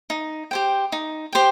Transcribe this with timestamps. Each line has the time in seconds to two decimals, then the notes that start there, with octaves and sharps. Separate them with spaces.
0.10 D#4
0.51 G4 C5 G5
0.92 D#4
1.33 G4 C5 G5